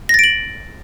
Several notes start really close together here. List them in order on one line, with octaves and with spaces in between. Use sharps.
A#6 A6 D7 F#7